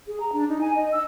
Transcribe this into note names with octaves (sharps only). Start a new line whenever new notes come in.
G#4
A#5
D4
D#4
G#5
D#5
E6